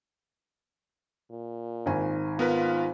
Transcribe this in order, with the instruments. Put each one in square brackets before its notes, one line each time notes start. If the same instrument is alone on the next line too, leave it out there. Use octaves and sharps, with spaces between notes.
[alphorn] A#2
[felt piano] G#1 D#3 G#5
[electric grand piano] B3 A#4 B4 [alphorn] F4